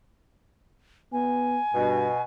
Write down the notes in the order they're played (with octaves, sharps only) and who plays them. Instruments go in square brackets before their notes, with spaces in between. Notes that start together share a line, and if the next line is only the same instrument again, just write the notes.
[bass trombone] B3 [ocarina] G#5
[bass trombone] G2 [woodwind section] B2